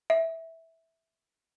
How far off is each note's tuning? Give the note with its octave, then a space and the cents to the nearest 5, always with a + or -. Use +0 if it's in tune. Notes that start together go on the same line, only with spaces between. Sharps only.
E5 -10